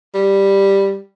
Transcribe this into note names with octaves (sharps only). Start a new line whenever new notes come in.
G3